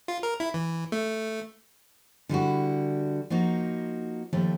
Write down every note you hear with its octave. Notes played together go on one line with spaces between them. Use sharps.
F4
A#4
E4
E3
A3
D3 G3 E4 F#4
F3 A#3 D#4 F#4
D#2 F3 A3 G4